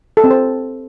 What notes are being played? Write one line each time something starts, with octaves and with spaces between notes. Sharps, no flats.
A4
C4
C5